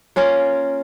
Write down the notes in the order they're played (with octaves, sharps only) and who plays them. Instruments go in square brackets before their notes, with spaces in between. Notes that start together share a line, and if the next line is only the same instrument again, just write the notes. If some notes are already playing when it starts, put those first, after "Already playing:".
[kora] A#3 C#4 F4 A#4